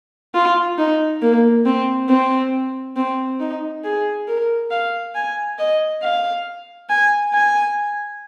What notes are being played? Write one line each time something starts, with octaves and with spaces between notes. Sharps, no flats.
F4
D#4
A#3
C4
C4
C4
D#4
G#4
A#4
F5
G#5
D#5
F5
G#5
G#5